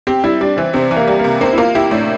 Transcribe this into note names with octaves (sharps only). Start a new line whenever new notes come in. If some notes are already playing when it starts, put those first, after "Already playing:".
C4 G4
G3 E4
G3 D4
E3 C4
C3 C4
E3
A#3
G3
C3 A#3
A#3 C4
E4
A#3 F4
E4 G4
A2 D4